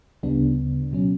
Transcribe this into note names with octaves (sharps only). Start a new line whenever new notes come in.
D2 C#3 G3 B3 D4
B2 F#3 C#4